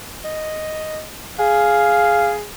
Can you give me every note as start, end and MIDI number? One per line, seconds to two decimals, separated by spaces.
0.24 1.03 75
1.39 2.45 68
1.39 2.34 77